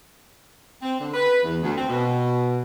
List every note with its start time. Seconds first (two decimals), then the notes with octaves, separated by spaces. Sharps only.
0.82 C4
0.99 D3
1.14 B4
1.44 E2
1.62 D2
1.76 C4
1.89 B2